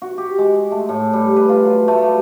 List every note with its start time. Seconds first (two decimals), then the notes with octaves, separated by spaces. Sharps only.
0.02 F#4
0.18 G4
0.38 G#3
0.72 A3
0.89 A2
1.13 G3
1.36 B4
1.49 F4
1.65 F#3
1.88 A3
2.02 G3